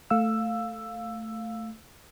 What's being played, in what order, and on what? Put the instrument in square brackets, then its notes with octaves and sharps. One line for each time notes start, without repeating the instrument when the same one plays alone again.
[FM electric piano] A3 F5 E6